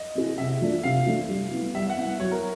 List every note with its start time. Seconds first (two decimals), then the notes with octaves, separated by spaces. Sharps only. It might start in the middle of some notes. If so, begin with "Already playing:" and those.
Already playing: D#5
0.15 C4 E4 G#4
0.38 C3 E5
0.61 F3 A3 D4 F4
0.83 C3 F5
1.06 F3 A3 D4 F4
1.29 G3
1.51 B3 E4
1.74 G3 E5
1.90 F#5
1.97 B3 E4
2.20 F#3 C#5
2.32 A#4